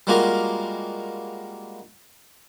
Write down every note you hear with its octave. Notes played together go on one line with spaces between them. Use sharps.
G3 G#3 A#3 F4 F#4 A#4